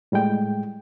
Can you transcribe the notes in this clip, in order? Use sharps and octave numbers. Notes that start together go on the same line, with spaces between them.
A2 G3 G#3 G5